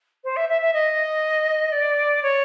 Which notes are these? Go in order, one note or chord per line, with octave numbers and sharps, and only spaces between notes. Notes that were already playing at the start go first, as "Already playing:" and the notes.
C5
E5
E5
E5
D#5
D5
C#5